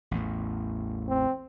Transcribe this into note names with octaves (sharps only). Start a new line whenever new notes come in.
A1 E2 A2
C4